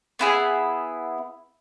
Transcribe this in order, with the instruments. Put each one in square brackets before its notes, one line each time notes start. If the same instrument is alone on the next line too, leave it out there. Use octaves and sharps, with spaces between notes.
[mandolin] B3 E4 G#4